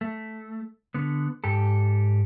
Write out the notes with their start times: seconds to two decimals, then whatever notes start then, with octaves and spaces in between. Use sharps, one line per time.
0.01 A3
0.94 D3 B3
1.44 G#2 G4 A4